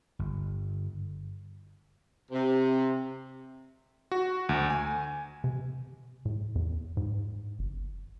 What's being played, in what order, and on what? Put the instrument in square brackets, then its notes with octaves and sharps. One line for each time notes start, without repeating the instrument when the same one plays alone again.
[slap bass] G1
[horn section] C3
[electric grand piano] F#4
D2
G#5
[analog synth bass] C3
A2
E2
G#2
G1